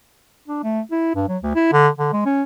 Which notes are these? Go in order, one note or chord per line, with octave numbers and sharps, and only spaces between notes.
D4
A3
E4
G2
F#3
D2
E4
D3
D3
G#3
C#4